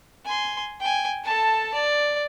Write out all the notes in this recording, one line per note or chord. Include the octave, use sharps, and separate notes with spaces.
G#5 C6
G5 G#5
A4 A5
D5